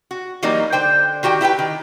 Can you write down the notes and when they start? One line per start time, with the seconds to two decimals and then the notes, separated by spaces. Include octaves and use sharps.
0.11 F#4
0.43 E3 F#3 G3 A#3 D#4
0.72 D3 C5 G5
1.23 D#3 F#4 G4 G5
1.41 E4 G4 B4 G5
1.59 D#3